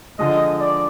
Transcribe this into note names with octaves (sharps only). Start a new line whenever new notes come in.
D3 F3 G#3 D#5
D5